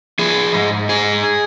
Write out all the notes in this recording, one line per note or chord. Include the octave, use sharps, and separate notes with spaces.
F3 G#4
G#2
G#2 G#4